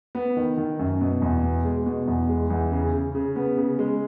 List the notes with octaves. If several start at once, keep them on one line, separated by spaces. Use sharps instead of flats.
B3
D#3
D#3
F#2
B2
E2
B2
G#3
B2
E2
G#3
E2
C#3
C#3
C#3
B3
C#3
G#3